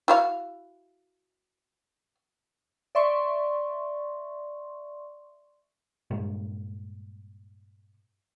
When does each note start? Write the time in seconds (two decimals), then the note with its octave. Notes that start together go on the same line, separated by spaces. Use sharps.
0.08 E4 F#4 F5
2.95 D5 E5 C6 C#6
6.11 G2 A#2 G#3 A#3